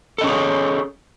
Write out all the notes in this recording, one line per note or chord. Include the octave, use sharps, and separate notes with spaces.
C#4 G#4 A4 C#5 D#5